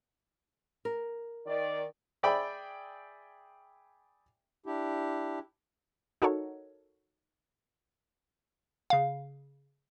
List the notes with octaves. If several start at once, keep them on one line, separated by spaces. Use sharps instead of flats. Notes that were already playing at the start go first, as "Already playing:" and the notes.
A#4
D#3 D5
G#4 D5 E5 G5 B5
D4 E4 G4
D#4 F#4 A4 A#4 C#5
C#3 F5